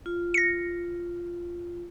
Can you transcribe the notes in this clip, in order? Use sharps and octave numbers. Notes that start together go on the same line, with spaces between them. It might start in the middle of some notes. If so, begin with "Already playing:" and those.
F4
A#6 C#7